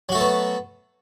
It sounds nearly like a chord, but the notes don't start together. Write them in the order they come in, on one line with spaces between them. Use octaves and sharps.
F#3 F#4 A3 A4 B3